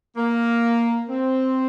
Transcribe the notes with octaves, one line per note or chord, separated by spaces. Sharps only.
A#3
C4